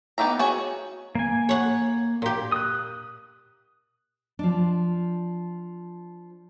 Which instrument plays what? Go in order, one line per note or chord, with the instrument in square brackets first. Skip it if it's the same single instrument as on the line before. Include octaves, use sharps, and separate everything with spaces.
[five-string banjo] B3 D#4 G4 E5 A#5
F#4 G#4 C#5
[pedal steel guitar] A#3 G#5
[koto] C#5 F#5
A#2 G4
[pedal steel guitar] D#6 F#6
[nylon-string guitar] F3 D4